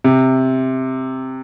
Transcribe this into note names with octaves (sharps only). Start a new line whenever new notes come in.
C3